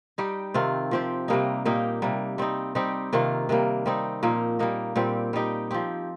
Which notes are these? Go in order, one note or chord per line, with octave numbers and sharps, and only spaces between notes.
G3 D#4 G4
C3 D#3 C4 F4
F3 C4 G4
C3 G3 A#3 D#4
A#2 A#3 D#4 G4
C3 G3 A#3
G3 C4 D#4
G3 C4 D#4 G4
C3 D#3 A#3 F4
C3 D#3 G3 A#3
G3 C4 D#4
A#2 F3 A#3 D#4
G3 A#3 D#4
A#2 G3 C4 G4
G3 D#4 G4
F3 C4 G4